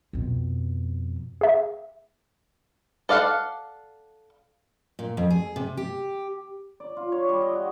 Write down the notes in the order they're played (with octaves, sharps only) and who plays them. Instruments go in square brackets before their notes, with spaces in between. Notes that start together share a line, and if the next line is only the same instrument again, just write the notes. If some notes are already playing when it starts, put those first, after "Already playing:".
[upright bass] F2 B2
[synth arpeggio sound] G#4 E5
[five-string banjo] A4 D5 F5 F#5
[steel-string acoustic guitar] A#2
F2
G#4
C3
G4
[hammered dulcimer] D5
F4
C#5
G3
D#5
F#4